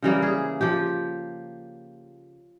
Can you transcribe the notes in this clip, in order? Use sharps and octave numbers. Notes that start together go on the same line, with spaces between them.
C#3 E3 G3 A#3
G#4
F3 G4